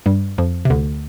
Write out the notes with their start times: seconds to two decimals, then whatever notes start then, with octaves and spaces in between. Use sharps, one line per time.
0.06 G2 G3
0.38 F2 F3
0.65 C3
0.70 D2 D3